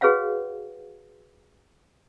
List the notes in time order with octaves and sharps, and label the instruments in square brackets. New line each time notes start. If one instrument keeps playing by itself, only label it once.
[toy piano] F#4 G#4 B4 C#5 F5 F#5